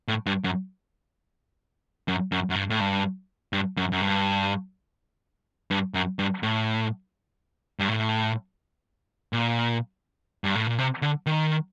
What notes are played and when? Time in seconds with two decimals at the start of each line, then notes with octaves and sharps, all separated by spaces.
0.08 A2
0.26 G2
0.44 F#2
2.08 F#2
2.32 F#2
2.50 F#2
2.56 G2
2.70 A2
2.81 G2
3.53 G2
3.77 F#2
3.92 F#2
4.01 G2
5.71 G2
5.94 F#2
6.19 G2
6.43 A2
7.79 G2
7.88 A2
9.33 A#2
10.44 G2
10.56 A2
10.67 A#2
10.78 C3
11.02 D3
11.26 D#3